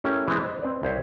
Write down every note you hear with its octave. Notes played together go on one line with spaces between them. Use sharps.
A3 C#4 E4 G4 A#4
E3 G#3 B3 C4 D4 E4
C5 D#5
C4 B4 D5
C2 C5 C#5 E5